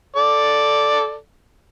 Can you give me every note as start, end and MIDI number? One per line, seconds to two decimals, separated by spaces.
0.16 1.14 69
0.16 1.14 74